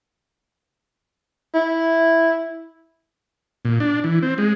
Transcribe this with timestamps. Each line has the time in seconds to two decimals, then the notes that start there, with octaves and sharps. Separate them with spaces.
1.55 E4
3.65 A#2
3.80 D4
4.04 E3
4.22 C4
4.38 G#3